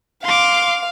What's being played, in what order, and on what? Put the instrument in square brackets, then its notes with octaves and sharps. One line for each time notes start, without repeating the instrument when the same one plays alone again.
[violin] F5 [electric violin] C6 D6